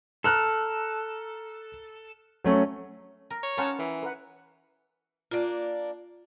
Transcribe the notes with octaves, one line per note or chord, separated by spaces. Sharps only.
A4 A#5 F6 F#6
F#3 A3 C#4
A#4
C#5
C#4 D#4 F4 A#4 F#5 A5
E3 A#4
A#4 B4 F#5
A#3 D4 F4 D5